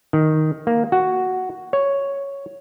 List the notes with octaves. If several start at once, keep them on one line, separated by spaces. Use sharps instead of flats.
D#3
A#3
F#4
C#5